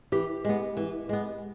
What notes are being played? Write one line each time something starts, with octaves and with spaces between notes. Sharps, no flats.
E3 G4
G#3 B3
E3
G#3 B3